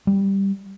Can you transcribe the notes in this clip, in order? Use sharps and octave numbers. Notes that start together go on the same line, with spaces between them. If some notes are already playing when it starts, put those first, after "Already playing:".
G3